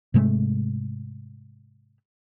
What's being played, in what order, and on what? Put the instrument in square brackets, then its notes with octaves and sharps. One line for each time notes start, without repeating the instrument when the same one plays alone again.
[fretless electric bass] G#2 C3 G#3 A3